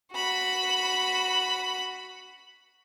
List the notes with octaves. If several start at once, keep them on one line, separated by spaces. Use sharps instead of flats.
F#4 B5